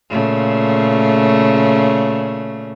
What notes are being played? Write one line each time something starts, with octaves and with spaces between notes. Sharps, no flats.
A#2 C#3 A3